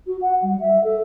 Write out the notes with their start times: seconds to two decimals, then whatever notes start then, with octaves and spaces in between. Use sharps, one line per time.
0.06 F#4
0.21 F#5
0.42 G3
0.60 E5
0.83 A4